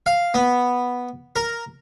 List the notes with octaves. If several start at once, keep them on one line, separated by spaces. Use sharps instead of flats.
F5
B3
A#4